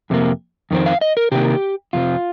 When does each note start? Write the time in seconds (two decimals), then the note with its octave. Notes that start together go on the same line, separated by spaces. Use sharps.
0.10 F2 C3 A#3
0.71 F2 D#3 C4
0.86 F5
1.01 D#5
1.17 A#4
1.32 C3 D#3 A#3 G4
1.93 F2 C3 F3 F4